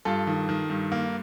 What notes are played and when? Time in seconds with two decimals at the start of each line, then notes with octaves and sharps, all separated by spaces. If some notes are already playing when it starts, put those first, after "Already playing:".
0.05 G2 F4 A4
0.27 D#3
0.49 D#3
0.70 G2
0.92 A#3